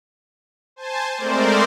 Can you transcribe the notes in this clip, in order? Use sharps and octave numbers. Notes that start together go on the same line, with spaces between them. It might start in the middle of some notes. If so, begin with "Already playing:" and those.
C5 G#5 A5
G#3 A3 C4 A#4 C5 D5